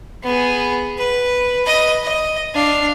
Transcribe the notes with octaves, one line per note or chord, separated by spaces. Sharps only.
B3 G#4
B4
B4 D#5
D#5
D4 F5